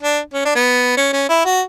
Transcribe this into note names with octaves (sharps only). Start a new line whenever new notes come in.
D4
C#4
D4
B3
C#4
C#4
E4
F#4